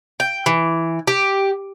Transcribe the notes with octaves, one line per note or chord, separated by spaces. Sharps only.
G5
E3
G4